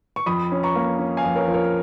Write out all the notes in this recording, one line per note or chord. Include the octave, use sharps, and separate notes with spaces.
C#6
F2 B5 D#6
C#4
A#5 C#6
A#3
C#4
F5 G#5
F2
A#4 C#5
F3
A#4 C#5